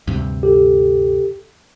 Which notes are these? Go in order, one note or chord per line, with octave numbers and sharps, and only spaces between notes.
D2 G2 C3
G4 A4